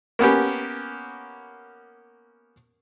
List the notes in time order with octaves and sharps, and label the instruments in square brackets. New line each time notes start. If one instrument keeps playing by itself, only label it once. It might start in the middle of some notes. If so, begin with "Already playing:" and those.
[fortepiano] A#3 B3 C#4 G4